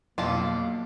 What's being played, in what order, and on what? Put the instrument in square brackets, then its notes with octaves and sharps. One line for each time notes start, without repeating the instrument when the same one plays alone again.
[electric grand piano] B1 [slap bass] F2 B2 [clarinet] A#3 [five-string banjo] D4 F4 A5